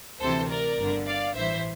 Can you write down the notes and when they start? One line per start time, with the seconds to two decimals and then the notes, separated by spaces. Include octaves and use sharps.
0.20 D2 C3 E3 A4 C5
0.49 A#4 D5
0.77 G1 G2 D3
1.06 D5 F5
1.35 A1 G2 E3 C5 E5